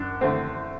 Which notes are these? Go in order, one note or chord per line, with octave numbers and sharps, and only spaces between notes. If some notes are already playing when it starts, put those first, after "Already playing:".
Already playing: F#2 D4
D3 A3 C4